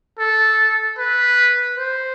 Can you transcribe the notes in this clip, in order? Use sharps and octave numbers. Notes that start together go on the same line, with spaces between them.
A4
B4
C5